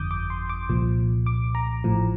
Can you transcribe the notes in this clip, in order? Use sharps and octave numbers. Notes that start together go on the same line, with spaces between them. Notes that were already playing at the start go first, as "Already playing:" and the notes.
Already playing: G1 F2 D3 F3 D6 D#6 G6
D6
C6
D6
C2 A#2 F3
D6
A#5
A1 A2 F3